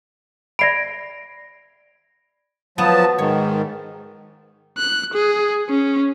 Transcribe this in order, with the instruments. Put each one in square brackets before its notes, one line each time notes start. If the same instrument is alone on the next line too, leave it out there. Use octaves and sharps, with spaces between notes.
[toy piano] D5 B5 [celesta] A#6 C7 D7
[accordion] F3 F#3 A5 [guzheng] B3
[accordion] G#2 D#3 [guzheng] C#5
[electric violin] F#6
G#4
C#4